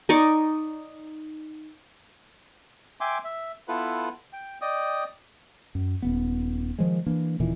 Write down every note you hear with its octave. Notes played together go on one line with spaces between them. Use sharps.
D#4 D5 C#6
E5 G5 G#5 C6 D6
E5
B3 E4 F4 A4 B4
G5
D5 D#5 G5 D#6
F#2
D#1 B3
D#3 F3 G#3
E3 A#3 D4
D#1 A#2 D#3 E3